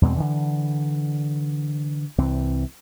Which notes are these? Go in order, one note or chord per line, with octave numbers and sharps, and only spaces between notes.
E2 B2 G#3 C4
D3 E3
C2 E3 C4